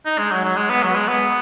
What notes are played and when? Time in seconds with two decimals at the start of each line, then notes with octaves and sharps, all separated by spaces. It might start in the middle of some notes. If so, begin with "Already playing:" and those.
0.06 D#4
0.18 G#3
0.31 F#3
0.44 F#3
0.57 G#3
0.70 B3
0.83 F#3
0.95 G#3
1.08 B3